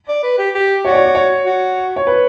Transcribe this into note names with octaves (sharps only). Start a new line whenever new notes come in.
D5
B4
G4
G4
F#4 C#5
D5
C#5
D5
C#5
F#4
C#5
B4